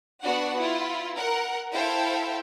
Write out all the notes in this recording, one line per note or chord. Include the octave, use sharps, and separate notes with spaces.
B3 D4 F#4 F#5
E4 F4
A#4 F#5
E4 A4 C5 E5 F5 G5